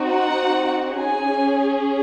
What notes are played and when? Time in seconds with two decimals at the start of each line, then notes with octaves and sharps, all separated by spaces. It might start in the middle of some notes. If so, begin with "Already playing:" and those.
Already playing: C4 D#4 F#4
0.10 F#5
0.98 C#4 G#4 G#5